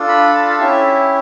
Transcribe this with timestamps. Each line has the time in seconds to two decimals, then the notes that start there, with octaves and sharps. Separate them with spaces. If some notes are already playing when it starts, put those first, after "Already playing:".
Already playing: D4 F4 A4
0.09 B5
0.34 A5
0.50 F5
0.59 C#4 E4 G4 E5